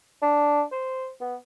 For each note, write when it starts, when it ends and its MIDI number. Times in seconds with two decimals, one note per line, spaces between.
0.22 0.63 62
0.72 1.10 72
1.21 1.35 59